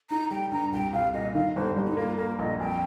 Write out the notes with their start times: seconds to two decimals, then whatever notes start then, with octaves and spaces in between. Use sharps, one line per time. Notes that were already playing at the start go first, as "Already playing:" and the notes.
0.10 D#4 A#5
0.31 G3 G5
0.51 G2 A#5
0.72 C2 G5
0.93 C2 F5
1.14 A#2 D#5
1.34 D#3 F5
1.56 G1 C5
1.76 G1 G4
1.87 D#4
1.97 A#3 F4
2.18 A#3 A#4
2.39 A#1 D#5
2.60 F2 G5